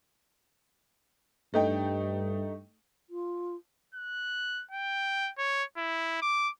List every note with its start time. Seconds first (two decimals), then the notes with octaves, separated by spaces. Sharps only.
1.54 G2 A3 D#4 G5
3.10 F4
3.95 F#6
4.71 G5
5.38 C#5
5.78 E4
6.22 D6